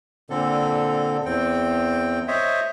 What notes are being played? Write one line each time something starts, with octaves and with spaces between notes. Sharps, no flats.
A#2 D3 C4 A4
E2 C4 G5
C5 C#5 D#5 E5